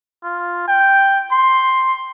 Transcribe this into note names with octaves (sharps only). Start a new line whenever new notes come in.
F4
G5
C6